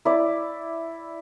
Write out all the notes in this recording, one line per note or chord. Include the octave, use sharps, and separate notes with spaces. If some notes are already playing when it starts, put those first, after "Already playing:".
E4 D5